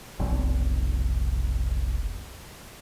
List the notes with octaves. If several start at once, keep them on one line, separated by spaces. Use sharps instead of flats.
F1 B1